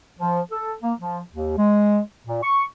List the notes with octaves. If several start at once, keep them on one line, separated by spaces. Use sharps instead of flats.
F3
A4
A#3
F3
D#2
G#3
A#2
C#6